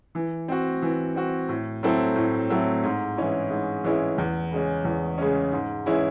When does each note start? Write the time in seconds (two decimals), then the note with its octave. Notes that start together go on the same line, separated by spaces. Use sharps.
0.15 E3
0.48 C4 F#4
0.82 E3
1.15 C4 F#4
1.49 A2
1.83 F#3 C4 E4 A4
2.16 A2
2.50 F#3 C4 E4 A4
2.83 G#2
3.17 E3 G#3 C#4 E4
3.50 G#2
3.84 E3 G#3 C#4 E4
4.18 E2
4.51 C#3 G#3 C#4
4.85 E2
5.18 C#3 G#3 C#4
5.52 G#2
5.86 E3 G#3 C#4 E4